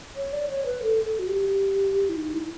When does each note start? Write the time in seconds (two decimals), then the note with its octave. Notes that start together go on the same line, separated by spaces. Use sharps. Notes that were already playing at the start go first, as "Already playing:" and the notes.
0.16 C#5
0.33 D5
0.50 C#5
0.66 B4
0.83 A4
1.05 A4
1.19 F#4
1.27 G4
2.09 E4
2.17 D#4
2.33 E4